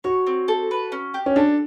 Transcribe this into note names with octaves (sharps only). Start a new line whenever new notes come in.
F#4 C#5
C4
A4
B4
C#4
G4
C#4
D4 A4